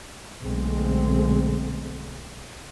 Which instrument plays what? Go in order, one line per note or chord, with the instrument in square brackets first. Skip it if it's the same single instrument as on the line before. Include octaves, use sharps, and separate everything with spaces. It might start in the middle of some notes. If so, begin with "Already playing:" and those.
[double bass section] B1 D3 G#3 A3 C4